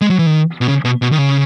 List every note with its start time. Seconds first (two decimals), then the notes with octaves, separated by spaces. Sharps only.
0.01 G#3
0.10 F#3
0.19 E3
0.26 D#3
0.61 B2
0.68 C#3
0.85 B2
1.02 B2
1.12 D#3
1.18 C#3